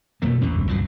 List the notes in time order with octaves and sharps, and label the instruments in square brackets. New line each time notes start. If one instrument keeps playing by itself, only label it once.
[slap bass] F2 F3 A3 [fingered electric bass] B2 A#3
[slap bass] A1 E2 E3 [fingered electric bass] C#4
[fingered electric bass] G1 C#2 G2
[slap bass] F1 F3 F#3